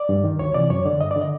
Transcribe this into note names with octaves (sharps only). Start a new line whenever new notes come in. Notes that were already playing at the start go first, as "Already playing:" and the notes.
Already playing: D5
G2
D#3
D2 C#5
C3 E3 D5
F#2 C#5
D3 D5
G2 D#5
D5
D3
D#5